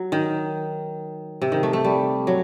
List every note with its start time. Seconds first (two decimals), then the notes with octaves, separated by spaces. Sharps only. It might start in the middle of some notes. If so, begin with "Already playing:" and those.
Already playing: F#3
0.12 D#3
1.42 C3
1.52 D#3
1.63 A3
1.73 A3
1.84 G3
2.27 F#3